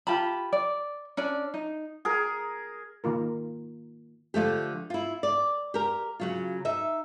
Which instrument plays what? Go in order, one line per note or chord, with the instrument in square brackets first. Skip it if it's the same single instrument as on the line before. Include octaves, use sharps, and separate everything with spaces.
[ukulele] F4 G4 A5 B5
D5
C#4 D4 D5
D#4
[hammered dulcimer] G#4 A#4
[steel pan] D#3 A#3 F4 A#4
[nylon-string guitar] D3 F3 A3 G4
E4 F4
D5
G4 A#4
C#3 F#3 F4
D#4 E5